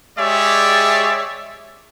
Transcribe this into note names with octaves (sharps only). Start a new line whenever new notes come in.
G#3 G4 G#4 C#5 D5 E5